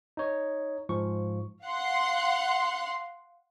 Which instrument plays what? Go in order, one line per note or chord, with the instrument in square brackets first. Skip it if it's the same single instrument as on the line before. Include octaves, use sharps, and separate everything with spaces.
[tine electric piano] D#4 C#5
G#2 F3 C#6
[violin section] F5 F#5 C6